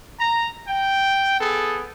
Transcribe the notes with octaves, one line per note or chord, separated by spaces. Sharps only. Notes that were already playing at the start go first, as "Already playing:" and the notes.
A#5
G5
B3 G#4 A4